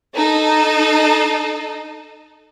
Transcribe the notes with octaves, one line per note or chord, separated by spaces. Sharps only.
D#4 A4